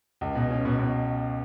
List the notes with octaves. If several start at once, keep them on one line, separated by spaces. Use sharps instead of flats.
C#2
B2
C#4
B2
B2